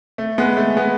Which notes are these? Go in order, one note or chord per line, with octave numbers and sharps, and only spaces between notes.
A3
G#3 B3
A3
G#3 B3